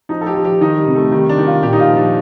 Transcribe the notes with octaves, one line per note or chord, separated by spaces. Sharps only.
F3 D#4
A4
G4
F3
G4
D#3 D#4
G3
C3
G3
A3
D#3 G3
D4
D#3
F4
A#2 G4
D#4
F4
F3
D4